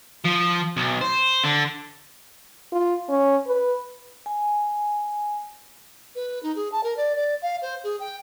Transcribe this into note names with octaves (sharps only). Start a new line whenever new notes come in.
F3
B1
C5
D3
F4
C#4
B4
G#5
B4
D#4
G#4
A5
A#4
D5
D5
F5
C5
G#4
G5